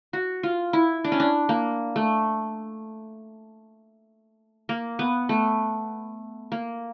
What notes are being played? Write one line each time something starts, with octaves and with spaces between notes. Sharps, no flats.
F#4
F4
E4
D4
C#4
D4
A#3
A3
A#3
B3
A3
A#3